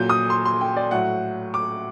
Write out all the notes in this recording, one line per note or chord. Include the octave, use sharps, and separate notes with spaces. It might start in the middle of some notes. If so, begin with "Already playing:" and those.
Already playing: A#2 F#3 G6
D#6
C6
C6
G5
D5
A2 F#3 F#5
D6